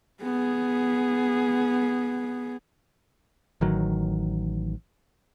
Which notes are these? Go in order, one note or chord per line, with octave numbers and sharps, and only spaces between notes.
B3 G#4
A1 D#3 F#3